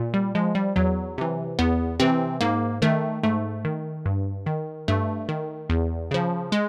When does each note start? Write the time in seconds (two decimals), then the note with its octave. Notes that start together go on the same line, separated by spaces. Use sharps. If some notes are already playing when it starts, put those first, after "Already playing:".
Already playing: A#2
0.14 G3
0.35 F3 G#3
0.55 G3
0.76 E2 F#3
1.18 C3 E3
1.59 E2 B3
2.00 C3 E3 C4
2.41 G#2 A#3
2.82 D#3 A3
3.23 G#2 A3
3.65 D#3
4.06 G2
4.46 D#3
4.88 G2 A3
5.29 D#3
5.70 E2
6.11 C#3 F3
6.52 G#3